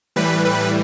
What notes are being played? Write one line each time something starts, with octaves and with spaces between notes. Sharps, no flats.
A2 E3 G3 B4
B4